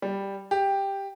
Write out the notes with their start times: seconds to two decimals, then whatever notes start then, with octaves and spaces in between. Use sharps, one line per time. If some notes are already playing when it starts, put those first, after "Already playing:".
0.02 G3
0.51 G4